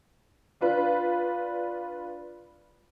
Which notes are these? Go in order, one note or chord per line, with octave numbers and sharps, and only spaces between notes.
D4 F4 B4